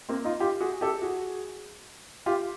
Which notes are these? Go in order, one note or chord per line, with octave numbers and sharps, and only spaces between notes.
A#3 C4
D#4 F4
F4 G4
F#4 G#4
G4 A4
F#4 G#4
F4 G4